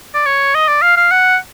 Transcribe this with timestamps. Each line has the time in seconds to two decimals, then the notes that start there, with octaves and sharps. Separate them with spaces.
0.14 D5
0.26 C#5
0.55 D#5
0.68 D5
0.82 F5
0.97 F5
1.11 F#5